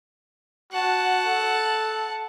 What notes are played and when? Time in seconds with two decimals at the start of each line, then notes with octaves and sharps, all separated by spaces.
0.73 F#4 F#5 A5
1.27 A4